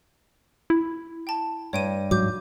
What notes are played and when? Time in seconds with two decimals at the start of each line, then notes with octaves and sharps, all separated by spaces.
0.70 E4
1.27 G5 A5
1.73 G2 C#5 G5 D#7
2.11 G#2 F#3 D6 G6